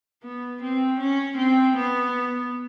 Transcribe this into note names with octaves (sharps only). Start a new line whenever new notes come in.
B3
C4
C#4
C4
B3